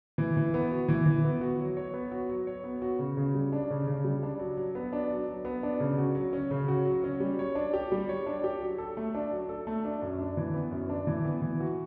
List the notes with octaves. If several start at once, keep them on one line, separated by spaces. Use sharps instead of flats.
E3
E3
B3
F#4
E3
E3
B3
F#4
F#3
C#5
B3
F#4
F#3
C#5
B3
F#4
C#3
C#3
G3
D4
C#3
C#3
G3
D4
F#3
F#3
B3
D4
F#3
F#3
B3
D4
C#3
F#4
F#3
C#4
C#3
F#4
F#3
C#4
G3
C#5
D4
G4
G3
C#5
D4
G4
F#3
A4
A3
D4
F#3
A4
A3
D4
F#2
D4
E3
B3
F#2
D4
E3
B3
E3
F#4